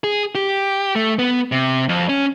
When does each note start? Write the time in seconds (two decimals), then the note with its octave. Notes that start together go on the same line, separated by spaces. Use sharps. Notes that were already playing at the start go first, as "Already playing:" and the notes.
0.04 G#4
0.35 G4
0.95 A3
1.19 B3
1.52 C3
1.89 F2
2.09 C#4